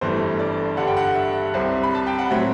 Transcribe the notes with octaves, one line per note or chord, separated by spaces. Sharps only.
G1 G2 E3 A3 C5
D5
G2 D3 G3 F#5
G5
F#5
E5
C2 C3 G3 C4
B5
A5
G5
F#5
A2 F#3 C4 E5